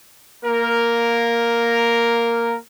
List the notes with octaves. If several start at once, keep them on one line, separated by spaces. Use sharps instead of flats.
A#3 A#4